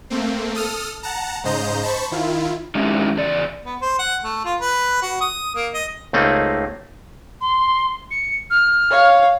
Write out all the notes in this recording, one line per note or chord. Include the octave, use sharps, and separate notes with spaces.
A3 A#3 C4
A4 D#6 F6
F#5 A5 A#5
G#2 C#3 C5 D#5 A#5 G6
C5 A5 B5 C#6
D#3 E4 F4
D#3 G3 G#3 C#4 D#4 E4
E2 C#3 D5
B3
C5
F#5
A3
F4
B4
F#4
D#6
A#3
D#5
C#2 A3 A#3 C4 D#4
C6
C#7
F6
C#5 F5